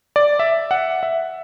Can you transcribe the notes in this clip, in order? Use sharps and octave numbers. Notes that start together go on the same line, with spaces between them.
D5
E5
F#5
E5